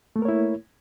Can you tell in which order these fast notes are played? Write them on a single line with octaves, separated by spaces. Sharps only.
A3 A#3 A#4 C#5 E4